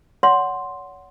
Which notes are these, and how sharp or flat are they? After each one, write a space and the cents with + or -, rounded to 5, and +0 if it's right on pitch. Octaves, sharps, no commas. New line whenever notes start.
C#5 +35 F#5 +0 C6 +0